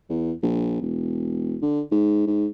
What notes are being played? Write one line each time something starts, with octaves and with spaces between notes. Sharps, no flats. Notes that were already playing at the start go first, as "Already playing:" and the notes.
E2
A#1
E1
D3
G#2
G#2